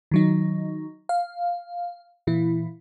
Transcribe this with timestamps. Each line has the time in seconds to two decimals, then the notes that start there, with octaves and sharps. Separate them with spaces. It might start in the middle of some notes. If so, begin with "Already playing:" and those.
0.11 D#3 F#3 D#4
1.09 F5
2.27 A#2 E3 E4